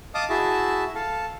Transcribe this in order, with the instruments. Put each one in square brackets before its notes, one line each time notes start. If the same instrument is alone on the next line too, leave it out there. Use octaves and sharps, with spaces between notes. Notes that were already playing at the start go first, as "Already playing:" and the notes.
[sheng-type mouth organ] D#5 F5 A5 D6 D#6
E4 F#4 G#4 E5 A5
A4 F5 A5